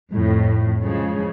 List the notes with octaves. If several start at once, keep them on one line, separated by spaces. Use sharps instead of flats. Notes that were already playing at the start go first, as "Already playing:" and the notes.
F2 A2
C#3 F3 G#3